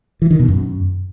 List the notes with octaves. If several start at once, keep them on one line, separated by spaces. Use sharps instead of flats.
E3
D#3
B2
F#2